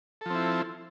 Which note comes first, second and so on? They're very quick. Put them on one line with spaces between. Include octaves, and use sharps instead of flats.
A4 F3 C4 E4